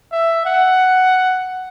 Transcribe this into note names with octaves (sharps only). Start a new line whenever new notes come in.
E5
F#5